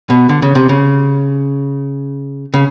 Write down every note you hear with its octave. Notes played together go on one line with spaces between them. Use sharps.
B2
D3
C#3
C3
C#3
C#3